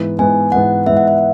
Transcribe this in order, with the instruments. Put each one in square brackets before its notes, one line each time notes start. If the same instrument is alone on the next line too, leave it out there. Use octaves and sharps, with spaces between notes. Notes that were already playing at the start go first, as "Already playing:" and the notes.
Already playing: [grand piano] G#2 E3 B3
[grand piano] G#2 E3 B3 [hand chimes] G#5
[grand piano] G#2 E3 B3 [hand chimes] F#5
[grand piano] G#2 E3 B3 [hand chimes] E5
[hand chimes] F#5
E5